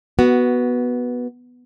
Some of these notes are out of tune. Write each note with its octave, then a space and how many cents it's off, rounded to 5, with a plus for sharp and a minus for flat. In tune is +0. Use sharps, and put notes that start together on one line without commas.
B3 -10 F#4 +10